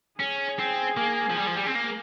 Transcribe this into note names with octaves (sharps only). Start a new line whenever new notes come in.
C#4 G#4
C4
A#3
F3
G3
F3
G3
C4
A#3